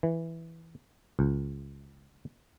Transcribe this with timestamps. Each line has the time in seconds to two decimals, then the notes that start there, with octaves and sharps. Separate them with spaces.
0.03 E3
1.19 C#2